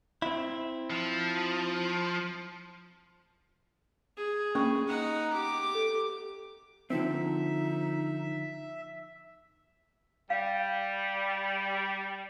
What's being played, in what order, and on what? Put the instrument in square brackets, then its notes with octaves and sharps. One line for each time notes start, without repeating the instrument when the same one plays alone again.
[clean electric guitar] C4 E4
[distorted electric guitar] F3
[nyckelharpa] G#4
[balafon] A#3 C#4 C#6
[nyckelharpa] D#4 F#5
G4 D6
[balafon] A4
[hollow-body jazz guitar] D3 F3 C4 [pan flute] D#4 [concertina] E5
[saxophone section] G3 [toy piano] F5